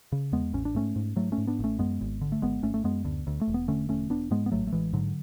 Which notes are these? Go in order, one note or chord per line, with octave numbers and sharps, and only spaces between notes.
C#3
E2 G#3 B3
A1 C#4
D4
G#2 A3 C#4
G#2
G#2 F#3 A3
A3 C#4
G#2
B3 D4
A1 A3 C#4
F#2 G#3 B3
G#1
D3
A3
G#1 G#3 B3
G#1 A3 C#4
A3
F#2 G#3 B3
D2
D2
A3
E1
B3
D3 A3 C#4
E1 A3 C#4
E1 B3 D4
G#2 G#3 B3
B3
A1 F#3 A3
A3
A1 E3 G#3
G#2 D3 F#3